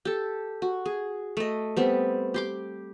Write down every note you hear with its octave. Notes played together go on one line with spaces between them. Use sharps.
G4 A4
F#4
G#4
A3 D#5
G3 B3 C4
G4 C6 D6